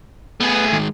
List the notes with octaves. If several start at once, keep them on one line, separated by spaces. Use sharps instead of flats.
A3 B3 G#4
D#3 G#3